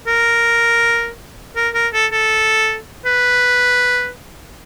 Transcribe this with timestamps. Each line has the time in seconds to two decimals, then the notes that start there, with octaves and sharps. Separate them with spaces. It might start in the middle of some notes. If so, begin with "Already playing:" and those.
0.07 A#4
1.56 A#4
1.74 A#4
1.93 A4
2.12 A4
3.05 B4